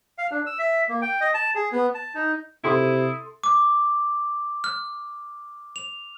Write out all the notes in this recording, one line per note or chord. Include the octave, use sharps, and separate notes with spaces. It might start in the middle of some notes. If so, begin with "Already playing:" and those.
F5
D4
E6
E5
A#3
G5
D#5
A5
G#4
B3
A5
D#4
C3 E4 A4 C6 D#6
D6
F6
F7